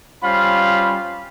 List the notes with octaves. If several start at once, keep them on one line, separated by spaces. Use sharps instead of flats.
G3 C#4 F4 C5 F5 B5